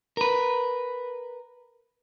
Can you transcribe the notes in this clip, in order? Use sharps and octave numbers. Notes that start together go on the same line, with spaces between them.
A#4 B4